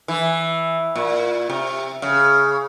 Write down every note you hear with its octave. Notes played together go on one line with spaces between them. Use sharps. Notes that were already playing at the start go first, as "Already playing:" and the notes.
E3
A#2
C3
C#3